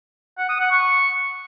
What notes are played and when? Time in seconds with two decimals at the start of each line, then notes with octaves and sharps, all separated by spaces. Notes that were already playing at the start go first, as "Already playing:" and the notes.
0.38 F#5
0.49 D#6
0.60 F#5
0.71 C#6